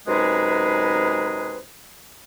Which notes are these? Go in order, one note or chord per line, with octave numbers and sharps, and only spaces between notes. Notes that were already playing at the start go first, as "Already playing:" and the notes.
F#2 C3 G#3 D#4 G#4 B4